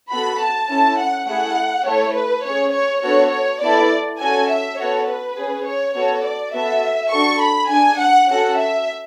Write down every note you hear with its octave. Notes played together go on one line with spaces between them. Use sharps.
B3 F#4 A4 B5
A5
C#4 E4 A4 A5
F#5
A3 E4 G#4 F#5
A3 E4 A4 C#5
B4
C#4 G#4 C#5
C#5
B3 D4 F#4 A4 C#5
C#5
B3 E4 A4 D5
C#4 F#4 A4 G#5
E5
B3 F#4 A4 C#5
B4
C#4 G#4
C#5
B3 F#4 A4 C#5
D5
B3 F#4 A4 E5
D4 F#4 A4 C#6
B5
D4 G#4 G#5
F#5
C#4 F#4 A4 F#5
E5